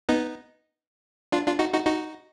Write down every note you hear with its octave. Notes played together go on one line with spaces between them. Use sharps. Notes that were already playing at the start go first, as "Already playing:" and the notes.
B3 D#4
D4 F4
D4 F4
D#4 F#4
D#4 F#4
D#4 F#4